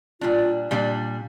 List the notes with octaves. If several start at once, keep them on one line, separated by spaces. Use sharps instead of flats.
A#2 G3 D4 F4
A#2 G3 D4